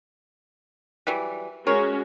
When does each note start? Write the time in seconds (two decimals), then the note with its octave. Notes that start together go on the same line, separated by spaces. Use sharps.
1.07 E3 F#3 G3
1.67 G#3 C#4 F#4 G#4 A#4 C#5